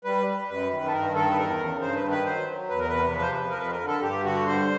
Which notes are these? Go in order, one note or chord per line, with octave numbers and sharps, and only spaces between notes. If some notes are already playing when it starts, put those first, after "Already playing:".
G3 B4
G3
F#2 B4
D#3
A4
G2 A#4
D#3 A4
B4
E2 A#4
C#3
G2 C5
B4
D#3
B4
F#3 C5
F#3
E2 B4
A#4
C3 B4
F3 B4
C5
F3 B4
A#4
F2 B4
A#4
D3
A4
G2 G4
D3 F#4
G3 C5